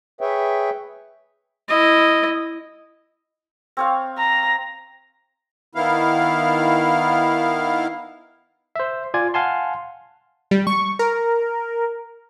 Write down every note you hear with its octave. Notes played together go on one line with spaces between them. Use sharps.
G#4 B4 C#5 E5 G5
E4 D#5
C4 C#5 F5
A#5
D#3 B3 E4 F5
C5 E5
F4 D5 G#5 G#6
F5 F#5 G#5 A5 C6
G3
C#6
A#4